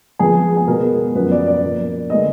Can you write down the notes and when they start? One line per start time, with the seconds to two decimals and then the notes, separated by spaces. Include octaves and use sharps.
0.19 F2 F3 G#3 B3 G#4
0.56 G#4
0.67 B2 G#3 B3 A#4
1.15 F#2 F3 B3 B4
1.31 D5
1.47 D5
1.62 A#2 F3 A#3
2.10 D3 G#3 B3 D#5